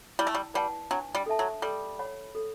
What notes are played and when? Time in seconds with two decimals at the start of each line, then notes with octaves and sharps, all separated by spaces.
0.19 G3 E4
0.27 A3
0.34 G3
0.54 G3 B4 F#5 A5
0.91 F#3 D4
1.15 G3
1.26 A4 E5 A5
1.39 F#3
1.62 G3 A4
1.99 C#5 F#5 B5
2.35 A4